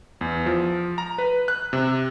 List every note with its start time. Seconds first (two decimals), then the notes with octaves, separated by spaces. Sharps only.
0.21 E2
0.46 F3
0.98 A#5
1.18 B4
1.48 F#6
1.73 C3